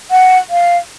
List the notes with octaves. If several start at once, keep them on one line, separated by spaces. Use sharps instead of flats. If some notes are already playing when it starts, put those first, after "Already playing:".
F#5
F5